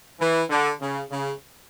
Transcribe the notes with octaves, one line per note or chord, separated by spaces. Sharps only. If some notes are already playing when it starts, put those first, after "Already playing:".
E3
D3
C#3
C#3